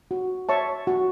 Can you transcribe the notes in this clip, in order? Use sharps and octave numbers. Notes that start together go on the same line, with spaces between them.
F#4
C#5 E5 A5 C#6
F#4